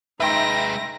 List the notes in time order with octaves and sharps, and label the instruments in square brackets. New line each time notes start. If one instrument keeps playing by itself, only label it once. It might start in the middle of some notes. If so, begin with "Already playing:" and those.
[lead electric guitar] G#3 B4 [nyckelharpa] D#4 [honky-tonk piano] E5 G5 C6 [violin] A#6